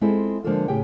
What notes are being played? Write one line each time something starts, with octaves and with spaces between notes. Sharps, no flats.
G#3 C4 E4 F4 G#4 A4
D3 F3 G#3 A#3 F4 A4
A2 C#3 G4 G#4 G5